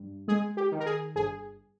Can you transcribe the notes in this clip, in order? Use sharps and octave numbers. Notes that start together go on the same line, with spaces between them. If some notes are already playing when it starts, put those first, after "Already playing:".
Already playing: G2
G#3 G#4
G4
D#3
A#4
G#4
G1 G#4